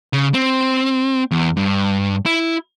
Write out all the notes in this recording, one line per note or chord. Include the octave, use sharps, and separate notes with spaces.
C#3
C4
E2
G2
E4